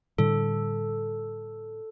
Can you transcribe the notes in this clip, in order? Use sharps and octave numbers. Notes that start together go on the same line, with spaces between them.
A2 D3 G3 A4